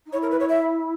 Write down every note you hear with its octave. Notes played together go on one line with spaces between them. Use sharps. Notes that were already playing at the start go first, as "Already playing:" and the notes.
D#4
E4 C#5
A#4
B4
C#5
E5